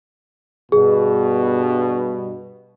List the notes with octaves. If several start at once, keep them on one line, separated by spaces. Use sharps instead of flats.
G2 B2 G#4